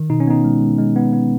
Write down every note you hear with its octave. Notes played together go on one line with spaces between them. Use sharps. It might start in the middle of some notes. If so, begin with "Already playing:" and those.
Already playing: D#3
B2 D#4
C#4
B3 D#4
G#3
G#3
G#3
B3
B3